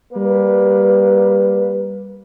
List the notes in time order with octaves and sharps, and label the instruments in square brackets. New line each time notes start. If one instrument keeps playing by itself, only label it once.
[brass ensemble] G3 A#3 B4